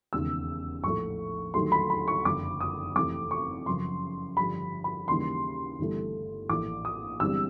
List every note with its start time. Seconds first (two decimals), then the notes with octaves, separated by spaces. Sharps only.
0.13 E1 D#2 C#3 E6
0.84 A#1 A2 F3 A3 C#6
1.54 D#2 D3 F#3 A3 C6
1.72 B5
1.90 B5
2.08 C#6
2.25 F#1 F2 D3 D6
2.61 D#6
2.96 F2 C3 E3 A3 C4 D6
3.31 C#6
3.66 F#2 C#3 F3 C6
4.37 G2 D3 F3 B5
4.84 B5
5.08 D#2 C#3 E3 G3 A#3 C6
5.79 G1 G2 E3 A3
6.49 A#1 A2 E3 D6
6.85 D#6
7.20 G1 G2 E3 G#3 C4 E6